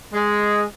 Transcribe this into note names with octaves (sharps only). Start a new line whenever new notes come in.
G#3